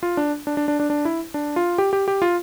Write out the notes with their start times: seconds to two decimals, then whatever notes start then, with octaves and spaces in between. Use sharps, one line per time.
0.03 F4
0.17 D4
0.47 D4
0.57 D4
0.68 D4
0.80 D4
0.90 D4
1.05 E4
1.34 D4
1.56 F4
1.78 G4
1.93 G4
2.08 G4
2.22 F4